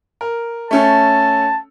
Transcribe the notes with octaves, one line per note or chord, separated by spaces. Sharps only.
A#4
A3 C#4 A4 A5